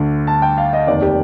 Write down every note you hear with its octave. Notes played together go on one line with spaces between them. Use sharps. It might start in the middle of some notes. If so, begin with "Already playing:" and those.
Already playing: D2 D3
A5
G5
F5
D#5
F1 D#2 D#3 D5
G4